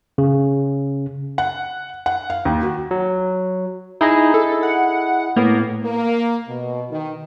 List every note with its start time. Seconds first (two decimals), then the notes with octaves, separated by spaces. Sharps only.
0.18 C#3
1.38 F#5
2.06 F#5
2.30 F5
2.45 D#2
2.63 F#4
2.91 F#3
4.01 D#4 E4 G#4 D#5
4.34 A4
4.63 F#5
5.36 A2 A#3 B3
5.83 A#3
6.48 B2
6.90 D#3